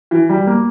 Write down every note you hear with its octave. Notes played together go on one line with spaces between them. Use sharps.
E3
G3
A#3